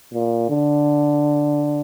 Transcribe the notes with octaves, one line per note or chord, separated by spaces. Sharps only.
A#2
D3